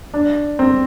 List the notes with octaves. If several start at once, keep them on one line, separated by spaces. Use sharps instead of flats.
D4
C4